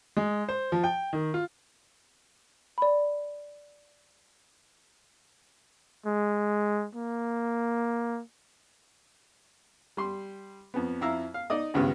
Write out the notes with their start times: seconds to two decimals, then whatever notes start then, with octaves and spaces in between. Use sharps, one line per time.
0.17 G#3
0.49 C5
0.72 F3
0.84 G5
1.13 D#3
1.34 F4
2.78 D5 B5
6.06 G#3
6.95 A#3
9.97 G3 C6
10.74 F2 B3
11.01 F2 E4 F5 A#5 E6
11.34 F5
11.50 D#4 D5 D#5 D#6
11.74 G#1 C#2 G2 C#3 B3 F6